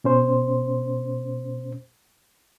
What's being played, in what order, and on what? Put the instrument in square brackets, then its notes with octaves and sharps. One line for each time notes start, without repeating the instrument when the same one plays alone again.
[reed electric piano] B2 C#4 C5